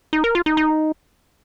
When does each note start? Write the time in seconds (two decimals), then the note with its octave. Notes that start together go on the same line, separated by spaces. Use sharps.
0.13 D#4
0.24 A#4
0.35 F4
0.46 D#4
0.57 D#4